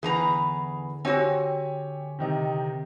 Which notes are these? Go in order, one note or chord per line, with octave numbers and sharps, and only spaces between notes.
E2 D3 G#4 B4 A#5
C4 F#4 G4 C#5 G#5
C3 D#3 D#4